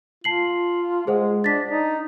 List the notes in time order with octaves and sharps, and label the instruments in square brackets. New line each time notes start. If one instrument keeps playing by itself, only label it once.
[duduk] F4 [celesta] A5 C7 F#7
[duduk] G#3 [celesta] G#4 C5 F#5
[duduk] D4 [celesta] A6 B6
[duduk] D#4 [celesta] D5